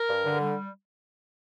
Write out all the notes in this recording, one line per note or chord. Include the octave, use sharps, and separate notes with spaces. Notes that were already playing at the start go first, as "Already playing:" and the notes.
Already playing: A#4
G2
D3
G3